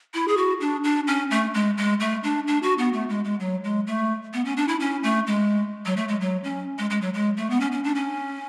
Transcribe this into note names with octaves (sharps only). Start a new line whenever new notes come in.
E4
G#4
F#4
D4
D4
C#4
A3
G#3
G#3
A3
D4
D4
F#4
B3
A3
G#3
G#3
F#3
G#3
A3
B3
C#4
D4
E4
C#4
A3
G#3
F#3
A3
G#3
F#3
C#4
G#3
G#3
F#3
G#3
A3
B3
C#4
C#4
D4
C#4